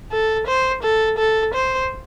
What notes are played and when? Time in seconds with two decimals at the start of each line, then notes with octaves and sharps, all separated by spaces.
0.12 A4
0.47 C5
0.83 A4
1.18 A4
1.54 C5